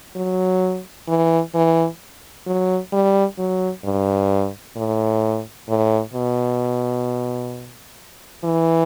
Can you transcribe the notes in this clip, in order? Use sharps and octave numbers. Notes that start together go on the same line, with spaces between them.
F#3
E3
E3
F#3
G3
F#3
G2
A2
A2
B2
E3